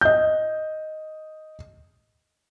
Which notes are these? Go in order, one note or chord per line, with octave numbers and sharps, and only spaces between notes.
D#5 G6